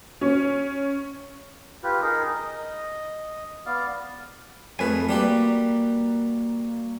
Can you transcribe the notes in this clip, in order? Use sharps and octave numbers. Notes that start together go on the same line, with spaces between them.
C#4
F4 G4 B4
D#4 G#4 A#4
D#5
B3 D5 F5
F2 A3 G#4 B4 G#5
G3 A#3 F#4 G4 B4